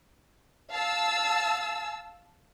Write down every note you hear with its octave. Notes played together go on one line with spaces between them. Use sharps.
F5 A5 E6